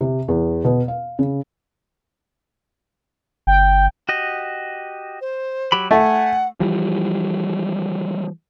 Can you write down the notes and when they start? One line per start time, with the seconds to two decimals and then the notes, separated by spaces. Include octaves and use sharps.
0.01 C3
0.28 E2
0.64 B2
0.88 F5
1.19 C#3
3.47 G1 G5
4.09 F#4 G4 D#5
5.20 C5
5.72 F#3 G4 B5
5.91 A3 F#5 G#5
6.60 E3 F3 G3